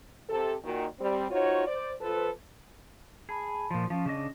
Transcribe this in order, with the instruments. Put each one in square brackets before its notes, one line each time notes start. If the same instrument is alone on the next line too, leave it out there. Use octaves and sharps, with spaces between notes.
[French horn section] C3 A4
A#2 D#3 F#4
G3 C4
D#4 F4 F#4 C5 C#5
C5 D5
F3 A4 B4
[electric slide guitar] G#4 [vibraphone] A5 B5
[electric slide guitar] A#2 F3
[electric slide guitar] F3 [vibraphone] C#4
[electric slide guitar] C#3 D4 D#5